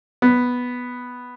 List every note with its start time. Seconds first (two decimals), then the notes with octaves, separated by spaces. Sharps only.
0.22 B3